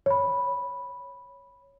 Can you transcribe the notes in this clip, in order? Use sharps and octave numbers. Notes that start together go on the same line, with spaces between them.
C#5 B5